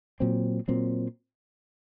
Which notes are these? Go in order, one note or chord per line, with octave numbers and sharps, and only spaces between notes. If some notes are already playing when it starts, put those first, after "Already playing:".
A#2 F#3 C4
A#2 F#3 C4